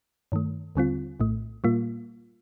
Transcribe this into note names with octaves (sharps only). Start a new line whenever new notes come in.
G2 D#3 A3
D#2 D3 G3 C4 F4
A#1 A2 A3
A#2 G3 A#3 F4